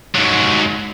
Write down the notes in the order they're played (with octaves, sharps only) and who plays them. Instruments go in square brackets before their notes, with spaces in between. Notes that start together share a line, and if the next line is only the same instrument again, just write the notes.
[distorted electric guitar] G#2 F#3